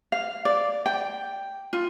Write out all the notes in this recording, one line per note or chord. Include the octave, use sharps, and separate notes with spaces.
F5
D5
G5
F4